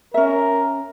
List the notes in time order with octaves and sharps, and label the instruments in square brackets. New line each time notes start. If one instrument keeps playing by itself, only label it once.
[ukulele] C#4 E5 [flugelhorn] A#4